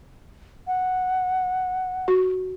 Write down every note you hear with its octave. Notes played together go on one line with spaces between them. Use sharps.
F#5
F#4